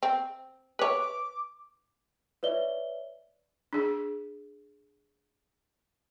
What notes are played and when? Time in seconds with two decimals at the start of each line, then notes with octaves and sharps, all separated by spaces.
0.03 C4
0.79 B4 C#5 D6
2.43 B4 C#5 D5 E5 G7
3.73 D4 G#4